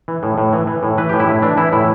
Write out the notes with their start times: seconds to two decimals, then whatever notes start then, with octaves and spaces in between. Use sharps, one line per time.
0.08 E3
0.23 A2
0.38 A2
0.53 E3
0.67 E3
0.83 A2
0.98 E3 B4
1.09 A2 G4
1.20 E4
1.28 A2
1.42 E3 D4
1.57 E3 E4
1.72 A2 E4